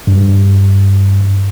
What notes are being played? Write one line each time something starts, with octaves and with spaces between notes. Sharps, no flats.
G2